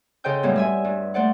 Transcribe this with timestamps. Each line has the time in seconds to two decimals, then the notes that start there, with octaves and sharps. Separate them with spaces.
0.24 C#3 A4 C5 D#5 G5 G6
0.43 F#2 A2 G3 B3 C4
0.56 G3 E5 G#5
0.85 G2
1.14 A3 C5 D5 F#5